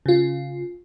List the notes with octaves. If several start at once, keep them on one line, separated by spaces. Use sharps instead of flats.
C#3 F4